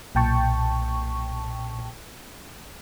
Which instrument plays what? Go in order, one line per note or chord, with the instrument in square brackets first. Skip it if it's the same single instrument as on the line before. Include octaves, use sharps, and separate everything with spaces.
[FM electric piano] B1 A#2 G5 A5 C#6